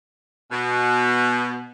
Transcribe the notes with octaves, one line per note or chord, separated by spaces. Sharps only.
B2